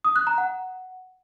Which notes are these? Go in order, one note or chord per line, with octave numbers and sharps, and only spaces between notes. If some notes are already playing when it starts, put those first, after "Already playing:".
D#6
F#6
A#5
F#5